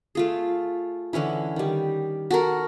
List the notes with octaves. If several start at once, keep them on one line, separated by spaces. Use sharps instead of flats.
A3 F4 G#4
D3 E3 C#4 E4
D#3 G3
F#4 A4 A#4